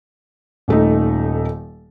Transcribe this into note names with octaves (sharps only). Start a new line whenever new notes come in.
D#1 A3 D#4